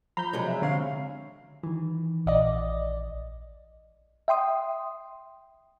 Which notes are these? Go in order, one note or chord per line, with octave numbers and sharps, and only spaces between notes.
F3 A#5 B5 G6
C3 F#3 G#3
E5
D3 C4 C#5 F5
D#3 E3
A#1 D5 D#5
E5 G5 C6 D#6